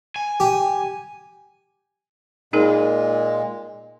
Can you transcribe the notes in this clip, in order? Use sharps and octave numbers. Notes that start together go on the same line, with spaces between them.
G#5
G4
A#2 G#3 D#4 G#4 A#4